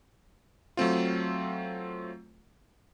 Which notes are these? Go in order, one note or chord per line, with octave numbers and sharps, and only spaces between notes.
F#3 A3 C4 F4